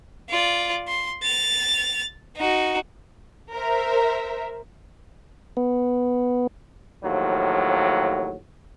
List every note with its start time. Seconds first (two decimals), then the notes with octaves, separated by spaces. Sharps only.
0.30 F4 D5
0.88 C6
1.23 A6 F7
2.37 D#4 F#4
3.52 A#4 C5 E5
5.57 B3
7.04 D#2 A2 F3 F#3